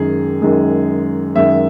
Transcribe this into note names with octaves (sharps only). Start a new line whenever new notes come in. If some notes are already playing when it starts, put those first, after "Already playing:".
Already playing: F#2 D#3 G#3 G#4
F#2 D#3 G#3
F#2 D#3 G#3 E5